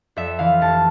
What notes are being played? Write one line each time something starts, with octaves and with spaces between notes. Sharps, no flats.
F2 E5
E3 F5
F1 A5